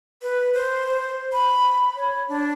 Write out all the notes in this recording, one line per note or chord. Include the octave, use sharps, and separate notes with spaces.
B4
C5
B5
C#5
D4